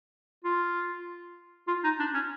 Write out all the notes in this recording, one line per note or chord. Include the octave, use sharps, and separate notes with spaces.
F4
F4
D#4
D4
C#4